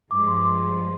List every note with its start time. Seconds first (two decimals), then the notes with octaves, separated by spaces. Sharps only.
0.10 G2 F3 G#3 D6
0.27 C6
0.37 D6
0.45 C6